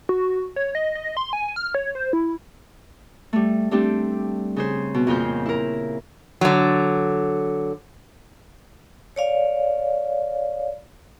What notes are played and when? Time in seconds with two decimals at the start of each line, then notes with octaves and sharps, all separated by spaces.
0.09 F#4
0.56 C#5
0.75 D#5
0.95 D#5
1.17 C6
1.33 G#5
1.56 F6
1.75 C#5
1.95 C5
2.13 E4
3.33 G3 A3
3.71 G3 A3 C4 D4 G4
4.56 C#3 G#4 C5
4.94 B2
5.07 F2 A#2 C#3 F4 C5 G6
5.46 E4 A#4
6.41 D3 F#3
9.16 C#5 D5 F5